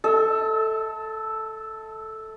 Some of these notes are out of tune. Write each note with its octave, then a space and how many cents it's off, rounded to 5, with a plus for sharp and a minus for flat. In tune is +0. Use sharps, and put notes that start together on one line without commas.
A4 +0 E5 -40